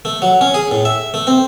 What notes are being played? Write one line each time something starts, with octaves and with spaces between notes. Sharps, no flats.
A3
F#3
C#4
G#4
A2
E5
A3
C4